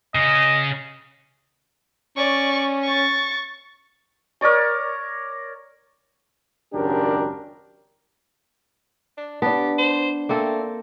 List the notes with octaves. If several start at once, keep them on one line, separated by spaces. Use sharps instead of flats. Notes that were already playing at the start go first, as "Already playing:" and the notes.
C#3 C#4 D#5
C#4 D5 C#6
C#6 A6
A#4 C#5 D5 C#6
G#1 C#2 F#2 D4 G4 A#4
D4
B3 D4 G4 A5
C5
A3 A#3 C4 A4